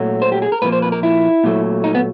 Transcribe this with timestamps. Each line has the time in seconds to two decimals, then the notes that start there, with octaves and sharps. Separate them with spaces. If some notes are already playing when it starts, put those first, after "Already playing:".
Already playing: A#2 F#3 A3
0.22 C5
0.32 G4
0.42 G#4
0.52 A#4
0.62 A#2 F3 A#3 B4
0.72 C5
0.82 B4
0.92 A#4
1.03 E4
1.44 A#2 F#3 A3
1.84 D#4
1.95 B3